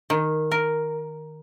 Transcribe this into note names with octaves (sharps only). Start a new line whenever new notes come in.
D#3
A#4